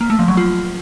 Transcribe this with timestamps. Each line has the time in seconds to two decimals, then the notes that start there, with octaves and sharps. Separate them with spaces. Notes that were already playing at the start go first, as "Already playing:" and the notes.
0.01 A#3
0.10 A3
0.19 F3
0.28 F#3
0.37 F4